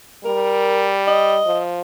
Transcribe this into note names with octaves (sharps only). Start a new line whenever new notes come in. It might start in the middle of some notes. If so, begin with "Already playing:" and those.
G3 A#4
D#5
F3